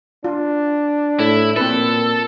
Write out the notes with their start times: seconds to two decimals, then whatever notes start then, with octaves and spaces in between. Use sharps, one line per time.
0.24 D4 F4
1.19 A2 E4
1.56 A#2 C4 A4 B4